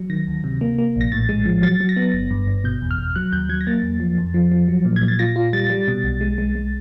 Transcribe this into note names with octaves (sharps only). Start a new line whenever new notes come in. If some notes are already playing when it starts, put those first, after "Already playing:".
Already playing: F#3
D#3 A#6
D2
C3
A#3
A#3
A#1 A#6
A2 A6
G#3
F3
F#3 A6
F#3
A#6
B3
G1
G2
G1
B2 G6
E2
F6
E2
F#3 F#6
D#2 G6
F#3 G#6
A#6
A#3 A6
E2
F3
F2
F3
F3
F#3
A#2
G#6
A#2
A6
F4 A#6
F4
G3 A6
G3
B2
B1
G#3
G#3
G#3